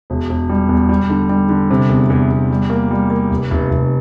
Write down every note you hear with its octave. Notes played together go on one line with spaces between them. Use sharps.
E1
E1
G3
E2
G3
D3
G3
D3
C3
E2
E2
E2
G3
A#3
G3
A#3
F1
F1
F1